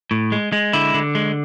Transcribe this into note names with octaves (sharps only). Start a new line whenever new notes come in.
A2
G#3
G#3
D3 E4
D3
G#3